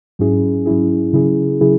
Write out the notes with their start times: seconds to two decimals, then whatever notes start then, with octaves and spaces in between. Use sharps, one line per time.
0.19 G#2 F#3 C#4 E4 G#4
0.66 G#2 F#3 C#4 E4 G#4
1.13 C#3 F#3 C#4 E4 G#4
1.61 C#3 F#3 C#4 E4 G#4